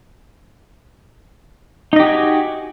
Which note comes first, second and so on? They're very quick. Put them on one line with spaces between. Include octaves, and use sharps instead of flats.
D#4 D#5 G4 F#4 G#5